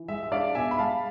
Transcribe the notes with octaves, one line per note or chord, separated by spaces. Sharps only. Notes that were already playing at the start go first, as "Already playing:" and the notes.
Already playing: E3
G#3 E5
E5
D4 D5 F5
B2 E5 G#5
B5
G#3 F5 A5